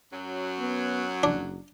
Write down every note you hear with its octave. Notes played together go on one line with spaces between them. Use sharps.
F#2 F#3
B3
F#1 D4